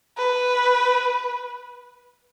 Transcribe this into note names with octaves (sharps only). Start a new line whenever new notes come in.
B4